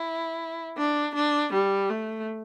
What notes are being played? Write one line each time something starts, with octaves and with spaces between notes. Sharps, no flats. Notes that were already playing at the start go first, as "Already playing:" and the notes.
Already playing: E4
D4
D4
G3
A3